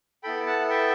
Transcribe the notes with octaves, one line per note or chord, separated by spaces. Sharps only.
B3 E4 A4 G5 B5
F#5 A5
E5 G5